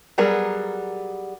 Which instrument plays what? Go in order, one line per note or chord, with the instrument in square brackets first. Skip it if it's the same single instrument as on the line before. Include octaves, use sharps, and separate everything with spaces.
[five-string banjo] F#3 G3 B3 G#4 A#4